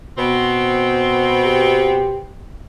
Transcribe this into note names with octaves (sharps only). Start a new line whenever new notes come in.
B2 B3 C4
G4